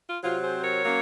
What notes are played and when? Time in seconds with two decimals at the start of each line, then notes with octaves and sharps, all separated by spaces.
0.08 F4
0.23 C3 F#3 C4 F4
0.42 G#4 C5
0.62 A#4 C#5
0.84 F#3 A#3 C#4